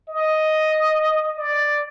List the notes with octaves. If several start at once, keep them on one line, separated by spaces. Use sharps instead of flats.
D#5
D5